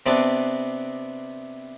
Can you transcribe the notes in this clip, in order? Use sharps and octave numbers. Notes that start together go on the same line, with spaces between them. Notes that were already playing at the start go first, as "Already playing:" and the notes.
C3 B3 C4 D4